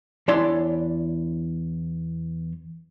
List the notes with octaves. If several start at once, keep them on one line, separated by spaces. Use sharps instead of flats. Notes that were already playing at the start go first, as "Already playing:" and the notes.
E2 D4 E4 C#5 D5 C6